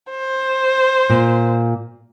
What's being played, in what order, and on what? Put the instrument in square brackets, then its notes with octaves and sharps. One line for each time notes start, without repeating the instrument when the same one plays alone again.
[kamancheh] C5
[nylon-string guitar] A#2